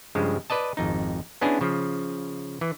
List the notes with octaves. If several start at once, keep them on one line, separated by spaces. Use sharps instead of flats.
G2 C#3 F3 G#3
B4 D5 D#5 A5
G#1 F2 D#4
B3 C#4 D4 E4 G#4
C#3 F3
E3